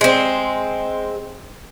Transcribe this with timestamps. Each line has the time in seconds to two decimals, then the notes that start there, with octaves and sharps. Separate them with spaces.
0.01 G#3 C4